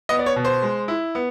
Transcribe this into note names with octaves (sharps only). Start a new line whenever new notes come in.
B3 D#5
D5
C#5
B2
C5
G#3
E4
B3